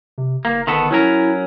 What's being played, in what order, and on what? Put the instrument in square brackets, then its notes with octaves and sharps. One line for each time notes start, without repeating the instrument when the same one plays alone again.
[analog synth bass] C3
[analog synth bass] F#1 [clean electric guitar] A#3
[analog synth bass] G1 [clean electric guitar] D#3 B3 A4
[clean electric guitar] F#3 C#4 A#4 [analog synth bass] E4